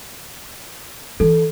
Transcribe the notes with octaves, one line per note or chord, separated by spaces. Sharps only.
E3 A4